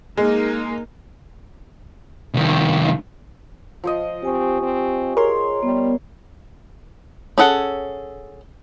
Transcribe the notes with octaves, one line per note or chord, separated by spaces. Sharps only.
G#3 A#3 D#4
C2 D#3
F3 C5 D#5
C4 G4 G#5 C#6
C4
G#4 A#4 C#5 C6
G3 B3
C#4 G#4 A4 F#5